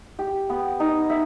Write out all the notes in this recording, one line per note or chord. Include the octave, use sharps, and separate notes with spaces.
G4
B3
D#4
E5